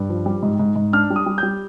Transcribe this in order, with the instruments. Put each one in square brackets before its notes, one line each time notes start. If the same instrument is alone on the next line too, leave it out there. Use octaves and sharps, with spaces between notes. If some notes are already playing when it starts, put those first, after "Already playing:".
Already playing: [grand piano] G2
F3
G3
G#2
G#2
G#2
D4 F6
G3
D#6
G3
G3 G6